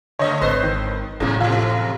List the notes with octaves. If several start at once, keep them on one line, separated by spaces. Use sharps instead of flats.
C#3 A3 C#5 D#5
G#1 A4 B4 C5
D#3
E2 A2 C#3 F#3 A3 A#3
F1 C3 E3 F4